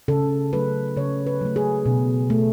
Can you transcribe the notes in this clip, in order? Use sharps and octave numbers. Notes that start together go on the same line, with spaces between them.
C#3 A4
F#3 A3 B4
C#3 C#5
B4
F#3 A3
G#4
B2
A3